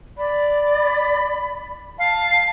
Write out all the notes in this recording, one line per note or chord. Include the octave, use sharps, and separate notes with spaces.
D5 B5
F5 A5